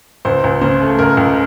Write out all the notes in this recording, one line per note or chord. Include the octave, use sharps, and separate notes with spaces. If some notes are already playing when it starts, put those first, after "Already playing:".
C#2 C5
C#2
C#3 C5
A3
C#2 A#4
C#2